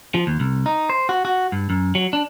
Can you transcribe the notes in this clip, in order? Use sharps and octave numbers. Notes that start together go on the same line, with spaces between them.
F3
D#2
C2
D#4
C5
F#4
F#4
G2
F#2
F#3
D4